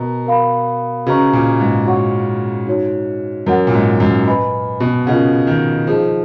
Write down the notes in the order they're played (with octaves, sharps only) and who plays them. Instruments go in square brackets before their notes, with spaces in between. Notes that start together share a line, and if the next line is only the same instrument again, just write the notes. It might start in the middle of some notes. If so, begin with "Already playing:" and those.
Already playing: [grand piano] B2 [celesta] A#4 D#5 A#5
[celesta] A#4 F5 B5
[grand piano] C#3 [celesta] F#4 B4 D#5 A#5 C#6
[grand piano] A#2
G#2
[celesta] F#4 C#5 F#5 C#6
D#4 F#4 C#5
[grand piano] F#2 [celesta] F#4 A#4 C#5 F#5
[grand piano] A#2
G#2
F#2
[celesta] B4 D#5 G#5 B5
[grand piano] B2
[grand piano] C#3 [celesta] F4 A#4 D#5 F#5
[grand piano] D#3
[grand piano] F3 [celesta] D#4 G#4 D#5